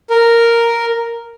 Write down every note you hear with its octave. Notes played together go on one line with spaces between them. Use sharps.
A#4